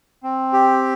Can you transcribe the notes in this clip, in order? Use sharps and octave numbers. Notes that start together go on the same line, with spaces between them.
C4
G4